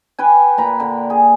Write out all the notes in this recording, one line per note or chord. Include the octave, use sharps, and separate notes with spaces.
B4 G5 G#5
A#2 A#5 B5
D3
G#4